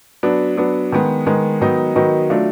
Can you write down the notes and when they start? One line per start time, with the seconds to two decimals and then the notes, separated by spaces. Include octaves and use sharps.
0.23 F#3 B3 D4
0.57 F#3 B3 D4
0.92 D#3 G#3 B3
1.26 D#3 G#3 B3
1.61 D#3 F#3 B3 D#4
1.96 D#3 F#3 B3 D#4
2.30 F#3 A3 D4 F4